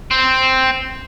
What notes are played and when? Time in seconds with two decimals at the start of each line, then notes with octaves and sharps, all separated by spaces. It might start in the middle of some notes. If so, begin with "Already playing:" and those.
0.11 C4